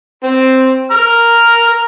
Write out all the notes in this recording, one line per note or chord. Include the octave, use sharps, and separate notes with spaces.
C4
A#5 F6